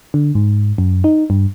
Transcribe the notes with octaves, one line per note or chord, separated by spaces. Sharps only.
D3
G#2
F#2
D#4
G2